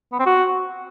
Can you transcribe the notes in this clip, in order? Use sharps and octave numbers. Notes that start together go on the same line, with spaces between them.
B3
C4
F#4